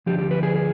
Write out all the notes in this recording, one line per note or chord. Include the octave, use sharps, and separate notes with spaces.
D2 D3 F3 G4
G4
B4
G#4
G#4